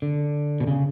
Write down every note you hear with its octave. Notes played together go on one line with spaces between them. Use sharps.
D3
B2
C#3